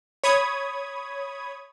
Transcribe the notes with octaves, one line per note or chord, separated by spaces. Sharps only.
C#5 B5 D#6 G#6